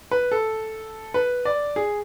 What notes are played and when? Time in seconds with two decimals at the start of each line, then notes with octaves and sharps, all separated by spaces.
0.11 B4
0.31 A4
1.14 B4
1.45 D5
1.76 G#4